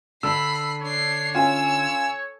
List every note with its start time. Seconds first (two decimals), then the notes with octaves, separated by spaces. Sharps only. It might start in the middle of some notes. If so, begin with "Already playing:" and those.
0.23 D3 B5 E6 C7
0.82 D4 C#5 C7
1.35 C#4 F4 G#5 E6